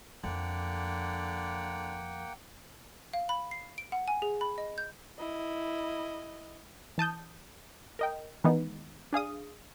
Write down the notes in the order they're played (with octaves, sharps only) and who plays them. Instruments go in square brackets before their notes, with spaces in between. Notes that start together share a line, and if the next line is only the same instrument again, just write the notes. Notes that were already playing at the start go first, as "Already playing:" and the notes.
[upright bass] F2 [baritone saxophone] D3 [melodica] A#3 F#5 G5
[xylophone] F5
B5
C7
D7
F#5
G#5
G#4
B5
D#5
G6
[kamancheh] E4 D#5
[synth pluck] E3 A5 D#6 G6
A#4 D#5 G5
D#3 E3 G#3 B3 D#4
D4 G#4 F5 D#6